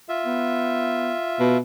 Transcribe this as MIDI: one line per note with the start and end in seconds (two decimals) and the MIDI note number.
0.09 1.58 65
0.09 1.58 76
0.25 1.13 59
1.40 1.59 47